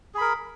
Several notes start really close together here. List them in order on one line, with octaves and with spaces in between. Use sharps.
G#4 B5 A#4